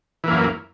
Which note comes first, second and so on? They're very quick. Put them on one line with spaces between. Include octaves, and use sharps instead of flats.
E3 A#3 F#2